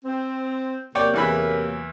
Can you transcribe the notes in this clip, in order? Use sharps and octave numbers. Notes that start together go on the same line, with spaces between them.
C4
C3 F#3 A#3 C#5 D5 G5
E2 E3 B5